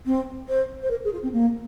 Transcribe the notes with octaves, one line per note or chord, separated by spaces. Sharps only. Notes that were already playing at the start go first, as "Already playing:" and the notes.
C4
C5
C5
A#4
G#4
F4
C4
A#3